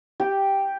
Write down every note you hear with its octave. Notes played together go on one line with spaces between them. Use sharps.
G4